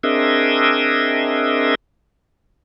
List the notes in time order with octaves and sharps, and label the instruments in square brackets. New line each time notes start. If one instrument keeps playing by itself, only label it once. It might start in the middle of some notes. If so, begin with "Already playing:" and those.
[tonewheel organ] C4 D4 G#4 A#4 D#5 E5